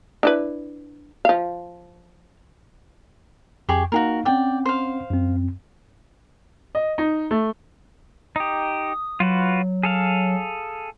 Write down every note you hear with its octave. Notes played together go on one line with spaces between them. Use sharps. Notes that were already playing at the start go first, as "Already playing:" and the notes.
D4 E4 B4
F3 F5
F2 G4 G#4 C#6
A#3 D#4 F#4 G#4 A#4 F5
C4 C#4 D5 F#5 G5
C5 F5
F#2 C4
D#5
D#4
A3
D#4 G4 D#6
F#3 F4 F#4 B4
G#4 A4 F5